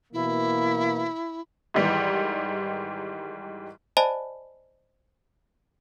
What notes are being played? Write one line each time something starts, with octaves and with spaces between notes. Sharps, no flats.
B2 E3 A#3 E4
G#2 D#3 E3 G3
C5 D5 D#5 G#5 A5 B5